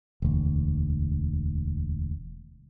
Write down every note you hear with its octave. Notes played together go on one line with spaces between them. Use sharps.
E1 D2